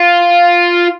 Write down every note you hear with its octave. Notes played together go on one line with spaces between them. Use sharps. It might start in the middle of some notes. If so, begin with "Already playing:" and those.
Already playing: F4